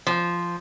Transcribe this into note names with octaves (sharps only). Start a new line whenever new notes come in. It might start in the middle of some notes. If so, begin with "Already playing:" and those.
F3